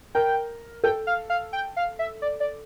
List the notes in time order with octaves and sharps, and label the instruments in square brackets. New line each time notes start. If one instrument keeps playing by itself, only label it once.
[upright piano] A#4 [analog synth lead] G5
[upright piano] A4 [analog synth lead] G5
[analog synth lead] F5
F5
G5
F5
E5
D5
D5